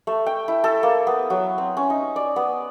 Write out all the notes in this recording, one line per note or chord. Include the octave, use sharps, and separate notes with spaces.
A3
G5
E4
A4
A#3
B3
F#3
C4
C#4
D#4
D5
B3